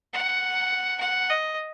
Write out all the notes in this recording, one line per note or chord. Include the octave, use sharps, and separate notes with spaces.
F#5
F#5
D#5